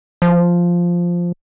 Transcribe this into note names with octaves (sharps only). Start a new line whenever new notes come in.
F3